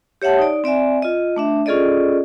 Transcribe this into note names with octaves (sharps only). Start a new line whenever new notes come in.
G4 C#5 E5 F#5 A5
D#4 D5
C4 D5 E5 G#5
F4 D#5
A3 D4 E5
C#4 F4 G#4 A4 D5 D#5